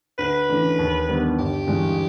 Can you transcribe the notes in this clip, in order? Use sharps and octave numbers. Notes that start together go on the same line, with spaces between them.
D2 B4
C#3 E3 A3 D4
D#2
D#3 G3 B3 D4
G1 G4
G2 E3 G#3